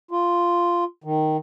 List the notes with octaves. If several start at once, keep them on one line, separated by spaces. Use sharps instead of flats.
F4
D#3